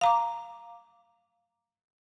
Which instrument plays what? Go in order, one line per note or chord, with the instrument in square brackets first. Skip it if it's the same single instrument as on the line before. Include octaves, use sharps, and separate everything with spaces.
[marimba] F5 A#5 D6